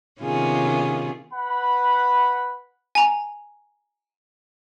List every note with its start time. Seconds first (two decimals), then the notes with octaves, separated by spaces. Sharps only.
0.21 C3 D#3 B3 C#4 F4 G#4
1.34 B4 F#5 B5
2.95 G#5 A#5